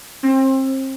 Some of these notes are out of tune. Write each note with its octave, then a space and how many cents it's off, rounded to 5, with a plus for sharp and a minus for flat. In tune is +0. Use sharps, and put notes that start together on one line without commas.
C4 +30